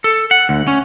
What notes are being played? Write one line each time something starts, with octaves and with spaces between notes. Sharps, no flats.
A4
F#5
D2
C#4